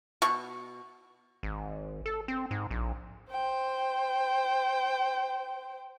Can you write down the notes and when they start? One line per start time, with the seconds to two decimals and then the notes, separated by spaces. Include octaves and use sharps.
0.22 B2 C#6
1.43 G#1
2.06 A4
2.28 C4
2.51 G#2
2.71 A#1
3.31 C5 G5